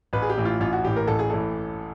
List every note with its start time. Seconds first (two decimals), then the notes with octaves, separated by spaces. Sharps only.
0.13 A1 B4
0.22 G#4
0.29 G4
0.37 A2 E3
0.45 F4
0.60 A1 F4
0.73 F#4
0.84 A2 E3 G4
0.96 A#4
1.07 A1 A4
1.19 G#4
1.30 A2 E3 A4